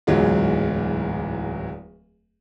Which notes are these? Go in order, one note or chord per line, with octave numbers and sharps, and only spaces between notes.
D1 E2 G#2 F#3 G#3 F4